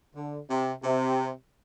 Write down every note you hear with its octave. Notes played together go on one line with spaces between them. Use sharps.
D3
C3
C3